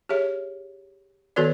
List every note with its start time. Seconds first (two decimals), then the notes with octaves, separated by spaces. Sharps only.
0.09 G4 G#4 C#5 E5
1.36 D#3 B3 F#4 A4 B4 D5